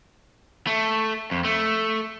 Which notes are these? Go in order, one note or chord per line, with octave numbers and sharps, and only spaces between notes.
A3
F2
A3